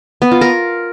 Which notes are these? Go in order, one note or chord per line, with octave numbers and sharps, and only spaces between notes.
B3
F4
A#4